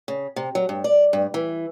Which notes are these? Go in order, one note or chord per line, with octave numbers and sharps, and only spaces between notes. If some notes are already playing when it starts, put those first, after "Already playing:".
C#3
C3
F#3
G2
D5
G2
E3